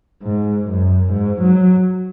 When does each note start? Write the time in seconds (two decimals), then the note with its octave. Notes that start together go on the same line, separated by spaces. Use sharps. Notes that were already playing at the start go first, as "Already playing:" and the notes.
0.23 G#2
0.68 F#2
1.11 G#2
1.41 F#3